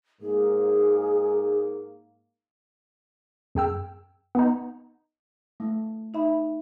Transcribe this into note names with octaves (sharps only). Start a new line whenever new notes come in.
G#2 A#3 G#4
F#2 G#4 G5 E6
B3 D#4
A3
D#4 E5 B5